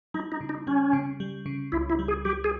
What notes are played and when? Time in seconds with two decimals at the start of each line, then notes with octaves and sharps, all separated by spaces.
0.14 G3 D#4
0.32 D#4
0.41 C#3
0.49 D#4
0.67 G3 C#4
0.93 C#3
1.20 G3
1.46 C#3
1.72 C#2 E4
1.90 E4
1.99 G3
2.08 G#4
2.25 G3 G4
2.44 G#4